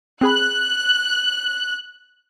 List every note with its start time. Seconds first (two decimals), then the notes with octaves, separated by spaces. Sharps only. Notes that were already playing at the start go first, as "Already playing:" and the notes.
0.21 C4 G#4 B5 F#6